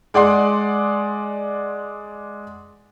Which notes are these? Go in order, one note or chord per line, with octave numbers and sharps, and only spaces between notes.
G#3 D5 F#5 C6